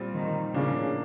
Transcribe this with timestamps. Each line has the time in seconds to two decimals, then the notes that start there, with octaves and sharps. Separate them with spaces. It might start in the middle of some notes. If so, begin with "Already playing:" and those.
Already playing: A#2 G3 C4 F4
0.15 D#3
0.54 A2 C#3 F3 A#3 D4